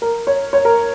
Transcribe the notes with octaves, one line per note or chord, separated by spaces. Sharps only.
A#4
C#5
C#5
A#4